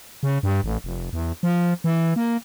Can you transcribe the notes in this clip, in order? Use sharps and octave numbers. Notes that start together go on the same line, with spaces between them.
C#3
G2
A1
F1
E2
F3
E3
A#3